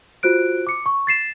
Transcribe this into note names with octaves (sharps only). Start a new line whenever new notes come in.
F4 F#4 C5 F#6 D7
D6 C#7
C#6
A6 C7 E7